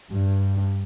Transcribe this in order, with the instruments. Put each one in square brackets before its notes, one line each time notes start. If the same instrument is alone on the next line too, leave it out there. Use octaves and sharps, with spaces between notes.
[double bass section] G2